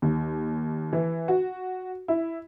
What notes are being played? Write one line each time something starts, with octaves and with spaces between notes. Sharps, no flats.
D#2
E3
F#4
E4